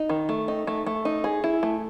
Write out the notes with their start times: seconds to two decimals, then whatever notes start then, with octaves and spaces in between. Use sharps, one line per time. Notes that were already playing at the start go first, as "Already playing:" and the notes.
Already playing: D#4
0.09 D#3
0.29 A3
0.48 D#4
0.67 A3
0.86 A3
1.05 D#4
1.24 G#4
1.44 E4
1.63 A3